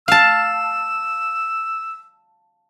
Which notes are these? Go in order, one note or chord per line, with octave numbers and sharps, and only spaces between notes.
F5 A5 E6